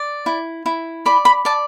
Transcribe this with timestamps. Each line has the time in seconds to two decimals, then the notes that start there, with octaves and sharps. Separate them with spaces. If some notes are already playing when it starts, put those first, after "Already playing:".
Already playing: D5
0.26 E4
0.66 E4
1.06 D5 B5
1.25 B5
1.45 D5 A5